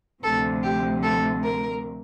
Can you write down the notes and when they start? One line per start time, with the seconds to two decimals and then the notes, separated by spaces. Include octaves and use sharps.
0.23 D2 C3 F3 A4
0.63 G4
1.03 A4
1.43 A#4